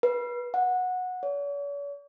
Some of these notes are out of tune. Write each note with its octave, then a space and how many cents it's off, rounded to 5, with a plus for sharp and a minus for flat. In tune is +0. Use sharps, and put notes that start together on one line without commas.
B4 -30
F#5 -15
C#5 +45